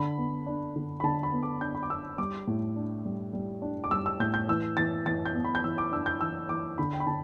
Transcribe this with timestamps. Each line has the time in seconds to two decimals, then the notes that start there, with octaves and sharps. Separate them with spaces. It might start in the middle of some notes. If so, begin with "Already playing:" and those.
Already playing: D3 B5
0.18 B3
0.46 D4
0.76 D3
1.00 B5
1.04 D3 A5
1.23 B5
1.32 B3
1.43 D6
1.61 D4 G6
1.75 B5
1.83 D6
1.90 D4 E6
2.18 G3 D6
2.47 A2
2.76 D4
3.05 G3
3.33 G3
3.62 D4
3.84 D6
3.91 G3 E6
4.06 E6
4.20 A2 G6
4.34 G6
4.49 E3 E6
4.77 E3 A6
5.06 E3 A6
5.25 G6
5.34 B3
5.45 B5
5.55 G6
5.64 E3 E6
5.78 D6
5.92 D4 E6
6.06 G6
6.21 E3 E6
6.49 E3 D6
6.78 D3 B5
6.93 G5
7.00 B5
7.07 D3 A5